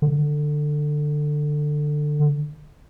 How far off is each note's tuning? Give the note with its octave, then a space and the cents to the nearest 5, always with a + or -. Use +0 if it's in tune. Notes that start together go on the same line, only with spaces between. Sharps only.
D3 +15